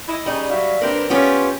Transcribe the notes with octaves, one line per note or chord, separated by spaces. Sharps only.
E4 D#5
C#3 G3 D#4
F#3 E5 F5
G2 C4 G4 A#4 B4
B3 C#4 F4 G4